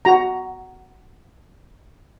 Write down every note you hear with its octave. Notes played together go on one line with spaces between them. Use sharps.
F#4 A#5